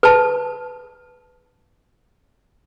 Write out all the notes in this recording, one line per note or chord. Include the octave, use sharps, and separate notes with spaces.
B4 A5